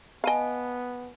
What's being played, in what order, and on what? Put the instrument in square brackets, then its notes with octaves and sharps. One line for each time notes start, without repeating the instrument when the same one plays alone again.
[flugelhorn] B3 [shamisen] D#5 F5 [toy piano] G#5 A5 B5